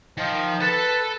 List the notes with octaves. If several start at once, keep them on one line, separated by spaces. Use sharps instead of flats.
D#3 F3
A4 B4 A5